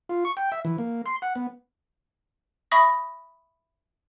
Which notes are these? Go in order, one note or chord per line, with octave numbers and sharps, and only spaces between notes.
F4
C#6
G5
E5
E3
A#3
C6
F#5
B3
E5 B5 C#6 D#6 A#6